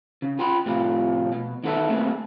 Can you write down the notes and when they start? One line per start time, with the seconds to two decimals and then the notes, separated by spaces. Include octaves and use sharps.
0.22 C#3
0.39 F4 G5 B5 C6
0.66 A2 C3 F3 F4
1.32 B2
1.64 D#3 B3 A4 C5 E5
1.89 A3 A#3 C4 G#4